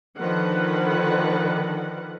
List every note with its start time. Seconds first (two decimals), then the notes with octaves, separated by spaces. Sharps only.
0.18 D3 D#3 F3 A4 B4 F#5